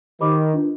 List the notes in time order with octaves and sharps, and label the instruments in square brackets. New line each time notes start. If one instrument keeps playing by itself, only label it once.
[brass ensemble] D#3 [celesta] G4 C5 D#5 B5 D6
[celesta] D4 F4 B4